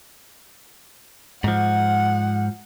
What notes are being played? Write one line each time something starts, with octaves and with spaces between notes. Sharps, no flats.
G#2 F3 F#5